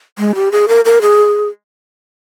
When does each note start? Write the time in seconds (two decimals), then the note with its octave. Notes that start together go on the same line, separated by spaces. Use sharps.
0.18 G#3
0.35 G4
0.52 G#4
0.68 A#4
0.85 A#4
1.02 G#4